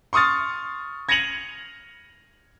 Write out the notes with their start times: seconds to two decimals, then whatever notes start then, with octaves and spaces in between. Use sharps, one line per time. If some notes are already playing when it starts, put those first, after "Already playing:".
0.13 C6 C#6 D#6 F6 A6
1.09 G#6 A#6 C#7 D#7 F7 F#7